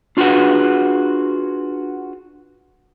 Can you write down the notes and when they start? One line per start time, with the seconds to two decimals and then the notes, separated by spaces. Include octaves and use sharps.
0.17 D4 F4 F#4 G#4 B4 F#5